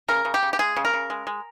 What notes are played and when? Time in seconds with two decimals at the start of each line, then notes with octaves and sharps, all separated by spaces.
0.08 C#3 A#4
0.25 C#3
0.34 G4
0.43 C#3
0.53 G4
0.59 G#3 G#4
0.76 C#3
0.85 A#4
0.93 C#3
1.10 G#3
1.27 G#3